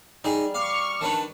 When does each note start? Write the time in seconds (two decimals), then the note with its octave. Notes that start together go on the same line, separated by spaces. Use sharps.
0.24 G3 D#4 G#4
0.54 F5 C#6 D6 F6
1.01 D#3 D4 B4 A5